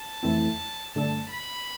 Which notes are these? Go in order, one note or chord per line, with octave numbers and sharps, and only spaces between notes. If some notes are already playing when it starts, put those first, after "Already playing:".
Already playing: A5
F2 E3 A3 C4 E4
G2 D3 A3 D4 A4 A5
B5